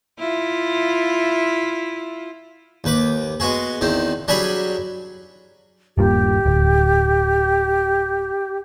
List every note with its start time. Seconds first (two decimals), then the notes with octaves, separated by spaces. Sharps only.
0.19 E4 F4
2.84 D#2 B4 D6
3.40 G#3 B3 F#4 G#4
3.81 E2 D#3 C4
4.28 F#3 G3 D4 G#4 G#5 B5
5.98 D#1 G2 A#2 G4
6.46 D1